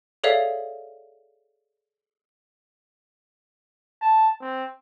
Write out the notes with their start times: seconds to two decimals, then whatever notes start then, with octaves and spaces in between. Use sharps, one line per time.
0.24 G#4 A4 C#5 D5 E5 F5
4.01 A5
4.41 C4